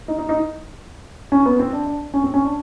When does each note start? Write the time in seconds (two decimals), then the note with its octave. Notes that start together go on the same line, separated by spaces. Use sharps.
0.08 D#4
0.19 D#4
0.29 D#4
1.32 C#4
1.46 B3
1.60 C4
1.73 D4
1.86 D4
2.14 C#4
2.24 C4
2.34 C#4
2.45 D4